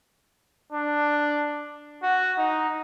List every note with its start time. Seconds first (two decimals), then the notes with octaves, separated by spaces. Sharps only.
0.72 D4
2.03 F#4
2.38 D#4